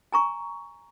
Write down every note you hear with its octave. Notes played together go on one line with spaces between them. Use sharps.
G#5 A#5 C#6